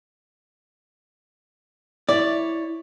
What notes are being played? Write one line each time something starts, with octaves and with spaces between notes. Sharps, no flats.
E4 C#5 D5